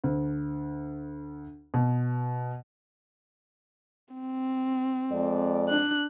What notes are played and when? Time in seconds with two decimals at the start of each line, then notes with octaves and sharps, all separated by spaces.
0.04 D2
1.74 B2
4.15 C4
5.11 F2 G#3 D5
5.69 D4 F#6